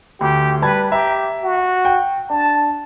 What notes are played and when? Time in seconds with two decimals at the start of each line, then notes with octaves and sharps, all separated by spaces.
0.21 D2 G4
0.62 G3 B4 A5 G#6
0.92 G4 E5 A#5
1.43 F#4
1.85 G5
2.30 D4 A5